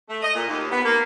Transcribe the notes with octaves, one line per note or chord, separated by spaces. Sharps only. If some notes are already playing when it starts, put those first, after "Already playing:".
A3
D#5
A#2
D#2
B3
A#3